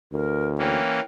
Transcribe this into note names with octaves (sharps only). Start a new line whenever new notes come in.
D2 A#4
E3 A#3 C#4 G5